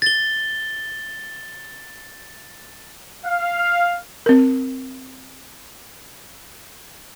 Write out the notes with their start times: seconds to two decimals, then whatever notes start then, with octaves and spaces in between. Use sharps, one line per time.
0.02 A6 G7
3.25 F5
4.26 C4 A#4